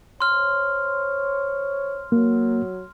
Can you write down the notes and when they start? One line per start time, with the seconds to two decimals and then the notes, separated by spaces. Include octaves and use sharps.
0.20 C5 C#5 C6 F6
2.12 F#3 A#3